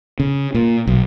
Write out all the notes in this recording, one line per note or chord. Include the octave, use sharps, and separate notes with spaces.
C#3
A#2
B1